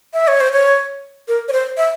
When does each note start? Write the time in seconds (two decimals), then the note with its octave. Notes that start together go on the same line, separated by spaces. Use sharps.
0.14 E5
0.28 C#5
0.40 C5
0.52 C#5
1.28 A#4
1.48 C#5
1.53 C5
1.77 E5